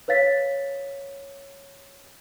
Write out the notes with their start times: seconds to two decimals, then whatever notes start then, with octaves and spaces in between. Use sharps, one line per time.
0.08 B4 C#5 F5 A6 B6